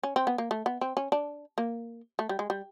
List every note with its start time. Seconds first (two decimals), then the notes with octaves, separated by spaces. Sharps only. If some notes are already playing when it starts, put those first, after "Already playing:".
0.03 C#4
0.16 C4
0.27 B3
0.38 A#3
0.51 A3
0.66 B3
0.81 C4
0.97 C#4
1.12 D4
1.58 A#3
2.19 A3
2.29 G3
2.39 G#3
2.50 G3